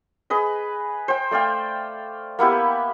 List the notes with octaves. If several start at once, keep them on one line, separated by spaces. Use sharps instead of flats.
G#4 B4 D#5
C5 G5
A3 D5 F5 G5
A#3 B3 E4 G4